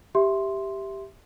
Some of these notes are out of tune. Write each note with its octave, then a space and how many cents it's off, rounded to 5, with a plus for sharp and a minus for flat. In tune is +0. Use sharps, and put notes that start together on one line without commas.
G4 +0 E5 +0 C6 +0